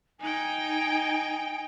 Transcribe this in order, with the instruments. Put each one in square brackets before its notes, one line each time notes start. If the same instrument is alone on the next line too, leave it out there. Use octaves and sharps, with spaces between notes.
[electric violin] D#4 G5 [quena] G#5